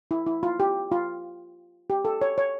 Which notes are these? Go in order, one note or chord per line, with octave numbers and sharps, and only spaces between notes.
E4
E4
F4
G4
F4
G4
A4
C#5
C#5